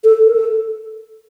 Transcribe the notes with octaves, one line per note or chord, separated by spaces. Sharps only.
A4
A#4
A4